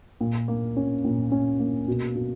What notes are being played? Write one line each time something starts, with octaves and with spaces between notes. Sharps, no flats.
A#2
A#3
C#4
A#2
C#4
A#3
B2
B2